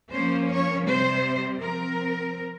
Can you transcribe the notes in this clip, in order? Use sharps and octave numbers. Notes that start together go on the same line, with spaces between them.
F3 A#3 C#4 C5
C#5
C3 G3 C4 C5
F3 C4 A#4